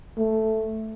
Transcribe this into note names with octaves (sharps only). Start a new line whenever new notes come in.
A3